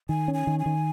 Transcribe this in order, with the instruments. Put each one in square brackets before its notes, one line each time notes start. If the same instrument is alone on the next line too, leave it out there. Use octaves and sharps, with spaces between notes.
[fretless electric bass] D#3 [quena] G#5
[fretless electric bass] C#4
[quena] G#5
[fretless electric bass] D#3
[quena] G#5
[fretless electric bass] D#3